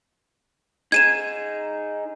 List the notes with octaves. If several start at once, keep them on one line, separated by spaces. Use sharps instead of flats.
D#4 G#4 G#6 D#7 E7